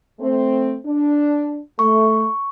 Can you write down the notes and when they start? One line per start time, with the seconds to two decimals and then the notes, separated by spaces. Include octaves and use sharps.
0.20 A3 C4
0.85 D4
1.79 A3 C#6